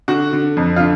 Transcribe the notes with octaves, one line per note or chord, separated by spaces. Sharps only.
D3 F#4
D3
F2
F4
D3